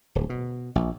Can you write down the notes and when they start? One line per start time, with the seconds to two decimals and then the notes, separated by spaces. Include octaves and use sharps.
0.15 D1
0.30 B2
0.76 A#1